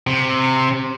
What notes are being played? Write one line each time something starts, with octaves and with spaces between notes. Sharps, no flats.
C3